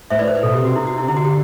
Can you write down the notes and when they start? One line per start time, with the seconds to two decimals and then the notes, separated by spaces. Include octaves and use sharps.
0.10 A2 C5 E5
0.19 B4 D5
0.27 C5
0.35 B4
0.43 B2 A4
0.54 G4
0.59 C3
0.65 F#4
0.76 E4
0.87 F#4
0.98 E4
1.08 D3 E4
1.17 F#4
1.25 G4